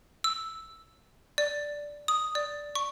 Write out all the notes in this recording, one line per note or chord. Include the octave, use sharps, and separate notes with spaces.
E6
D5
D#6
D5
C#6